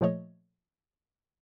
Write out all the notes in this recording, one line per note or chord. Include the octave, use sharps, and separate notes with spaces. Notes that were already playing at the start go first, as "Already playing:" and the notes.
A#2 F3 A3 C#5 D#5